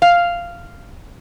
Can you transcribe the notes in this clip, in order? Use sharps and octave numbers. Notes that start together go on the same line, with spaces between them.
F5